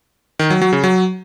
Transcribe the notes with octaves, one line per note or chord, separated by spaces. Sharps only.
D#3
F#3
F#3
C#3
F#3